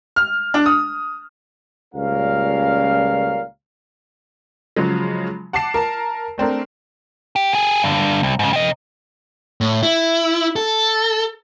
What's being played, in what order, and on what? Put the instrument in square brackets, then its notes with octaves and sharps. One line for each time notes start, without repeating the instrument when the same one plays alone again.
[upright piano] F6
D4
D#6
[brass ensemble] C#2 A#2 G3 C#4 A#4 F5
[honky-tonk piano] C#3 F3 F#3 G#3
F#5 A5 D6 C7 E7
A#4 A5 E7
A3 C4 D4 A#4
[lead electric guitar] G4
G4 G#4
G2 D3
C2
G#2 C#3
C3 D#5
A2
E4
A4